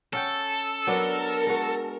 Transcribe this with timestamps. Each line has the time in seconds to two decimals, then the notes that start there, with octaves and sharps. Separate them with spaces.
0.13 C#4 A4 F#5 G5
0.87 F#3 B3 D4 A#4
1.47 G#3 F#4